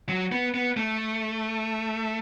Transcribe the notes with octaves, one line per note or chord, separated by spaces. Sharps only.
F#3
B3
B3
A3